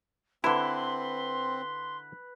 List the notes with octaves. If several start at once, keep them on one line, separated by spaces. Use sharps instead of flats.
D3 C4 E4 B4 C6